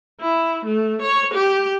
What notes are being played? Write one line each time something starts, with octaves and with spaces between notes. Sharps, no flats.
E4
A3
C#5
G4